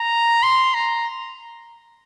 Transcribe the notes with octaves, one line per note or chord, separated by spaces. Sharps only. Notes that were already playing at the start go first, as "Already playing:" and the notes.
Already playing: A#5
C6
A#5